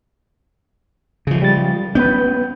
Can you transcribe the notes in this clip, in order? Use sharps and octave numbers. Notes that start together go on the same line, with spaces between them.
C#3 F3
G3 A6
B3 C#4 B4 G6